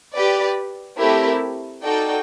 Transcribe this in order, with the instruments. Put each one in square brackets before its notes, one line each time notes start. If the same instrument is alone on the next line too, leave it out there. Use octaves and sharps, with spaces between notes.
[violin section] G4 B4 D5
A3 C4 E4 G4 A#4
D#4 F#4 A4 D5 G5